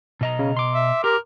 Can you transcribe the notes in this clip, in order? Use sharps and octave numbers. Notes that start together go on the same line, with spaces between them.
B2 D#5 A#5
C#3
C6 D6
E5
G4 A#4